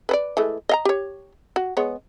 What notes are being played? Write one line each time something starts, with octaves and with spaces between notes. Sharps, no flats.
B4 C5 D5
E3 G#3 A3
D#5 F5 A#5
G4 C#5
F#4
G#3 B3 C#5